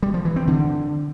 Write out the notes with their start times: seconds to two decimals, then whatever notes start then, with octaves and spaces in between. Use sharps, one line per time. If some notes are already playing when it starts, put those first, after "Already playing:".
0.03 G3
0.14 F3
0.25 E3
0.36 C4
0.47 D3